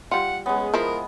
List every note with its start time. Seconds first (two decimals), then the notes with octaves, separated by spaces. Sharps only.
0.11 G3 F4 F#5
0.46 G#3 B3 C#4
0.74 F3 E4 F4 A#4